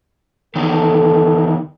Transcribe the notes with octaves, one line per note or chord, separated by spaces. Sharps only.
E2 D#3 A4